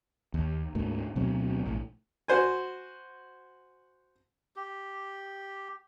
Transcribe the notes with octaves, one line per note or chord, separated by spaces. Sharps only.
D#2
D2 G#2 A#3
D2 B2 F#3 C4
A#1 A2
F#4 C5 G#5
G4